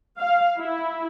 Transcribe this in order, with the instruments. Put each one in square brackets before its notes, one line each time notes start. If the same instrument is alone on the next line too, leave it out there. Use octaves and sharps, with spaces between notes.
[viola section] F5
E4